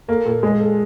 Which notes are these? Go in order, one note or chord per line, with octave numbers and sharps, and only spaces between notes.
A#3 A4
A#2 A4
G#3 G#4
A4